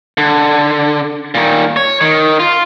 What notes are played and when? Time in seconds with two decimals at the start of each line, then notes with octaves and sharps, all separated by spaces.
0.18 D3
1.35 A#2 D#3
1.76 C#5
2.01 D#3
2.40 F4